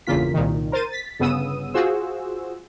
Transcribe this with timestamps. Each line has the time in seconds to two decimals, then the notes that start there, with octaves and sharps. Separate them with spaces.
0.07 G1 E2 C#3 A#3 F4 B6
0.34 C2 A#2 D#3
0.72 A#4 C5 A6 D#7
0.91 A6 B6
1.20 G1 C#3 B3 D#6 E6 D#7
1.74 F4 F#4 G#4 C5 E6